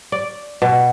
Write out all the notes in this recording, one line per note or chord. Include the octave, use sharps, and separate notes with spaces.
D5
B2